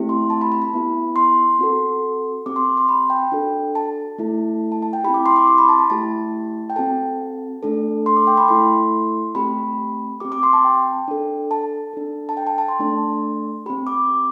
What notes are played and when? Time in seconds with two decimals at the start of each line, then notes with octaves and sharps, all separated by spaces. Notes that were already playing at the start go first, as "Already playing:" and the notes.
Already playing: A3 C4 E4 G4
0.09 C6
0.30 A5
0.41 B5
0.52 B5
0.62 B5
0.73 B3 E4 G4
1.16 C6
1.59 C4 F#4 A4
2.46 C4 G4 D6
2.56 C6
2.77 C6
2.88 B5
3.10 G5
3.32 D4 F#4 A4
3.75 A5
4.18 A3 E4 A4
4.72 A5
4.82 A5
4.93 G5
5.04 C4 E4 G4 B5
5.14 D6
5.26 C6
5.36 D6
5.48 C6
5.58 B5
5.69 A5
5.79 A5
5.90 A3 E4 G4 A5
6.70 G5
6.76 C4 F#4 A4 A5
7.63 A3 D4 A4
8.06 C6
8.17 D6
8.27 G5
8.37 B5
8.48 A3 E4 A4 C6
9.35 A3 C4 G4 B5
10.20 C4 G4 D6
10.32 D6
10.43 C6
10.53 A5
10.64 G5
11.08 D4 A4
11.51 A5
11.93 D4 A4
12.29 A5
12.37 G5
12.47 A5
12.58 A5
12.68 C6
12.79 A3 D4 A4
13.66 C4 G4 B5
13.87 D6